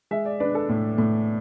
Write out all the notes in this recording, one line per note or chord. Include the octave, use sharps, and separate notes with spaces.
G#3 E5
D5
D4 B4
A4
A2
A2